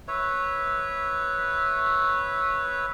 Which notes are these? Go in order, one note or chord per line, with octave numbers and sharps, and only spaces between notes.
B4 C#5 E5